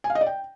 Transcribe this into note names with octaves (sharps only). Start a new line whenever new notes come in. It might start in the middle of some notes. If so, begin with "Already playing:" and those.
G#5
F5
D#5
D5
G5